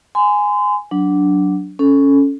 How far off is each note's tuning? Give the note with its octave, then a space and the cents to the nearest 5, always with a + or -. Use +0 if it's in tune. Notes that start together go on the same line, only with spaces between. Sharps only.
G#5 +0 C6 -35
F#3 +0 D4 -10
C#4 +0 A4 -5